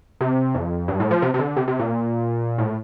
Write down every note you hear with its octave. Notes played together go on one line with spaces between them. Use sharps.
C3
F2
G2
A2
F3
C3
C3
D3
C3
C3
A#2
A2